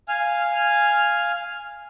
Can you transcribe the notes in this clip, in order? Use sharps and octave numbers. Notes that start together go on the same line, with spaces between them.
F5 G#5 F6